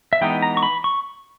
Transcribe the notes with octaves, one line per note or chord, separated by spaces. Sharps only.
E5
E3 G#3 B3 D#4 G5
A#5
C#6
B5
C#6